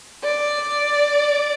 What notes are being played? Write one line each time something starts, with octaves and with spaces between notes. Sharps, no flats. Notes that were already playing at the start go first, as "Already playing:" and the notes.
D5